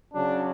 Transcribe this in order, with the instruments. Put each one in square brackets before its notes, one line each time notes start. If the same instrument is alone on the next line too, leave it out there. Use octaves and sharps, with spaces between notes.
[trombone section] C#3 F#3 D4